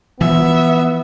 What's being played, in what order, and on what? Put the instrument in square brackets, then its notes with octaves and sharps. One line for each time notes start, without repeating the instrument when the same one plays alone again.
[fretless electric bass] E3 F3 [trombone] B3 [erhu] E5